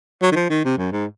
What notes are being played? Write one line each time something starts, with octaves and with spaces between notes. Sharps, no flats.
F#3
D#3
F3
D#3
C3
F#2
G#2